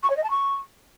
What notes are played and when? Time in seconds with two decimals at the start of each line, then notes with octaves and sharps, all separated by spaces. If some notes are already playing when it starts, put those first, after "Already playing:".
0.03 C#6
0.09 C#5
0.16 D#5
0.23 A5
0.30 C#6